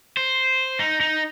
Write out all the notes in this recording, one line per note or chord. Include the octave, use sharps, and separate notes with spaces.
C5
D#4
D#4